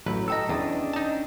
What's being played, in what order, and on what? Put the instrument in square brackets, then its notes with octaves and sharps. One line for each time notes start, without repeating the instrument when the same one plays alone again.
[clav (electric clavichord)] A1 B4 [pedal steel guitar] F#3
[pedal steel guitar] A4 A#5 [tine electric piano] D#5 G5 E6
[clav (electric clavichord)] E2 [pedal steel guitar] C#4 D4 D#6
[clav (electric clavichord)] D#4 A5